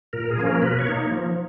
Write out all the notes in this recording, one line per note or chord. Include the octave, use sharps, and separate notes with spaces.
A#2 A#4
G#4
F3 A#3 C#4
A#4
B2 B4
C#5
A#3 D#4
F3